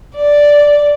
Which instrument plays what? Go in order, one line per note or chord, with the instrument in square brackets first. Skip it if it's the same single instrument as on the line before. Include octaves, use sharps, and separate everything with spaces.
[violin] D5